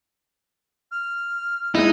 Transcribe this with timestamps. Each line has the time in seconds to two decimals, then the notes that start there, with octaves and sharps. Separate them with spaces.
0.91 F6
1.75 G#3 D#4 E4